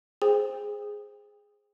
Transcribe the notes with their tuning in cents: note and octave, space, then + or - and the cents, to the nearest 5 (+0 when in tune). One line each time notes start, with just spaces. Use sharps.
G#4 +0 C5 +0 G5 +35